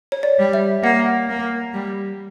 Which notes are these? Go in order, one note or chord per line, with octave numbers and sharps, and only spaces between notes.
C#5
D5
G3
E5
A#3 F#5
A#3
G3